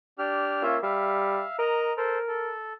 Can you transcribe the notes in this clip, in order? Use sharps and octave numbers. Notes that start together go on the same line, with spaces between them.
D4 G4 F6
A#3 C#4 F4 E5
G3 E5 F5
A#4 D#5 A#5
A4 A#4 C5
A4